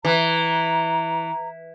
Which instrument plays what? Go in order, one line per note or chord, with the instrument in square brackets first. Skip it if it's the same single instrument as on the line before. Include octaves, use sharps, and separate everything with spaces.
[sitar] E3 [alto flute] A#5